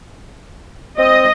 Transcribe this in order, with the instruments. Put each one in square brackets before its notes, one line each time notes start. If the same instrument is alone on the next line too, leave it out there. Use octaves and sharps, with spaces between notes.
[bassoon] C4 [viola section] D#5